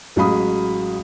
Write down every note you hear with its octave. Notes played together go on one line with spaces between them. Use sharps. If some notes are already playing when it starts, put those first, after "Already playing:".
A1 F#3 G#3 F5 B5 D#6